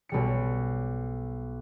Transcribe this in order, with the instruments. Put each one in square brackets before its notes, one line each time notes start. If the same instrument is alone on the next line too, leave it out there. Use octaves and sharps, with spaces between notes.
[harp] B1 G3 C#7